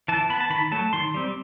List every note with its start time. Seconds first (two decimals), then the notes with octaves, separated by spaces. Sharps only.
0.08 E3 A5
0.30 B3 B5
0.40 A5
0.50 D#3 B5
0.71 F#3 A3 A5
0.93 D#3 C6
1.14 G3 C4